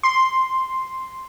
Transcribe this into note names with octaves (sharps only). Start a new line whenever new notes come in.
C6